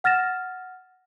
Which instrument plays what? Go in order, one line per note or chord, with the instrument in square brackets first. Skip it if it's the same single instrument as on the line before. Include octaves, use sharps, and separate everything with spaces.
[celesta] F#5 F6 A6 A#6 E7